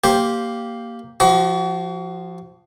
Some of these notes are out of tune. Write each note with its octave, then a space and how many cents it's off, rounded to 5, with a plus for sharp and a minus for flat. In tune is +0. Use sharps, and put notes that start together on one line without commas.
A#3 +0 G4 +0 C5 +5
F3 +0 F#4 +35 C#6 +45